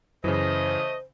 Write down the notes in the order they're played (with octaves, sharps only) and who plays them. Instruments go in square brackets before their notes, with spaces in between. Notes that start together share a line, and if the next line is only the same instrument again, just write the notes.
[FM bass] F#2 [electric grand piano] C#3 E3 [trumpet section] A3 D#5 [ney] C5